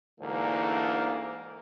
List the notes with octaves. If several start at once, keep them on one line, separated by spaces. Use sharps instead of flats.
D2 G#2 D3 E3 A#3